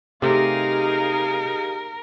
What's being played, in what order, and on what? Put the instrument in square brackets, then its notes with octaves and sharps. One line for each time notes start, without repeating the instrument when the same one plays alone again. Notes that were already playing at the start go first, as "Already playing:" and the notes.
[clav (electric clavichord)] C3 A3 [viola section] D#4 G#4 F5 [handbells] G4 [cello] A#4